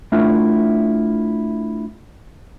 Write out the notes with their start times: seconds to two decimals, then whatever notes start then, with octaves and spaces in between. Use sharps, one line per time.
0.12 A3 D4 E4 F4 A#4